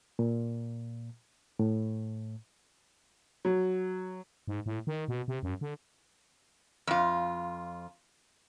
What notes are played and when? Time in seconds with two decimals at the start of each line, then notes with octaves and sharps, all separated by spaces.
0.19 A#2
1.59 A2
3.45 F#3
4.48 G#2
4.66 A2
4.87 D#3
5.08 B2
5.28 C3
5.43 F#2
5.61 D3
6.87 F2 F4